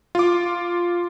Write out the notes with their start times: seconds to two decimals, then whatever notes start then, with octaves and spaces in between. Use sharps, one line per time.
0.15 F4 D6